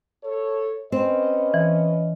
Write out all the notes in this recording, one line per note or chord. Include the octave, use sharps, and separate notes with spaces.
A4 C#5
C4 C#4 B4 D#5
E3